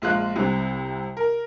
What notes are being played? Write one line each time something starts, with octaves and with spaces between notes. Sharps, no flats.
A#1 G#3 F4 F#6
C2 C3
A#4